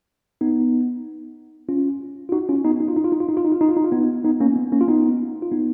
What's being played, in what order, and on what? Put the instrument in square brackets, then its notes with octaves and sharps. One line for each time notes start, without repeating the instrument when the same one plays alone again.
[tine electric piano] B3 D#4
C#4 F4
F4
D#4 F#4
C#4 F4
B3 D#4
D#4
F4
D#4
F4
D#4
F4
D#4
F4
D#4
F4
D#4
F4
D#4
F4
B3 D#4
B3 D#4
A#3 C#4
B3
A#3 C#4
F4
B3 D#4
F4
B3 D#4